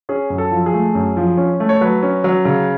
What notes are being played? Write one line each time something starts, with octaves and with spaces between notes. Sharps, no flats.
C#4 G#4
F#2
A4
F3
G#4
A3
F#2
F3
C#4
A3
C#5
F#3 B4
C#4
F#3
C#3